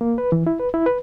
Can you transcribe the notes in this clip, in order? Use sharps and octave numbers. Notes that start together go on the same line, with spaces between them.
A#3
B4
E3
E4
B4
E4
B4